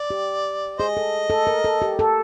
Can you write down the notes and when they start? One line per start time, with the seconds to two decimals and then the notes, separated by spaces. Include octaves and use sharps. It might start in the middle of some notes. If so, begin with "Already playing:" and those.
Already playing: D5
0.10 G4
0.79 G#4 C5 D#5
0.97 A4
1.30 A4
1.47 A#4
1.65 A4
1.82 G4
1.99 A4